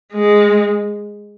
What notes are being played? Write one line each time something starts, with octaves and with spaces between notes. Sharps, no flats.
G#3